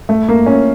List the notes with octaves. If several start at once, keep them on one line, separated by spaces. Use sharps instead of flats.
A3
A#3
C#4